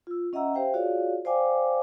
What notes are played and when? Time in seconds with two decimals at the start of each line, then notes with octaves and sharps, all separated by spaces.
0.07 F4 E6
0.33 C#4 D#5 E5 F#5 A#5 E6
0.54 G4 C5 E5 F5 G5
0.74 F4 F#4 G#4 C#5 D5 F5
1.25 C5 D5 F5 G5 G#5 D6